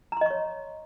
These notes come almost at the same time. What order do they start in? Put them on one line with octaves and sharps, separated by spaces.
A#5 C6 D#5 C#6 C#5